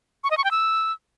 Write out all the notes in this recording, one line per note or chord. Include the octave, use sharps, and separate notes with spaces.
C#6
D#5
C#6
G5
E6